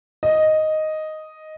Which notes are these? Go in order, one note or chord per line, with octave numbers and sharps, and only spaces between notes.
D#5